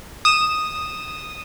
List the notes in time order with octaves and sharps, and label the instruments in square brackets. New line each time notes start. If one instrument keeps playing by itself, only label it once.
[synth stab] D#6 E7